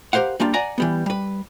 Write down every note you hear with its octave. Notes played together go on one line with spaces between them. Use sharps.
G4 A#4 C5 F5 F#5
G3 A#3 D4 F4
D5 F#5 G#5 A#5
E3 G3 B3
G3 B4